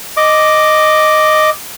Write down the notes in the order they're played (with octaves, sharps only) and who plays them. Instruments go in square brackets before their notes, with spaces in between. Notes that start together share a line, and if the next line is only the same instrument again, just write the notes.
[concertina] D#5 D6